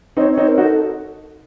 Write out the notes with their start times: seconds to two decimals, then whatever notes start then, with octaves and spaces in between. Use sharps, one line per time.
0.17 C4 D#4 C#5
0.32 C#5
0.37 C4 D#4
0.47 A#4
0.58 D#4 F#4
0.63 A4